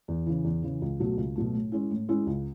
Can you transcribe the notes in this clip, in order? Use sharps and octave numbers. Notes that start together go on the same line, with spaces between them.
E2
C#3 E3
E2
C#3 E3
C#2
B2 F#3 A3
C#2
B2 F#3 A3
A2
G#3 C#4 E4
A2
G#3 C#4 E4
C#2